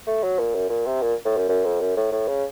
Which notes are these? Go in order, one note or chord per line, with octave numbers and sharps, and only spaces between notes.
A3
F#3
A#2
F#2
A#2
C3
A#2
A2
F#2
F#2
F2
F#2
A2
A2
C#3